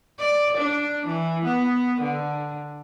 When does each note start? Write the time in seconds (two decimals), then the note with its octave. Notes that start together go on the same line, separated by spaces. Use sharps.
0.18 D5
0.57 D4
1.07 E3
1.45 B3
2.01 D3